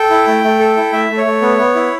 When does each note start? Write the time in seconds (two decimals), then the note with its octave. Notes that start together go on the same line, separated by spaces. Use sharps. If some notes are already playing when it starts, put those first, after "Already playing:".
Already playing: A4 G5
0.10 E4
0.27 A3
0.44 A3
0.59 A4
0.77 E4
0.93 A3 E5
1.10 A3
1.17 C#5
1.26 A3
1.42 B3
1.58 B3
1.75 E4